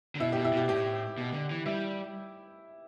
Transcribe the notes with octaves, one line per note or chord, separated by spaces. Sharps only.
D3
B2 E4
G4
B2
E4
B2 G4
A2 G4
B2
D3
E3
G3 E4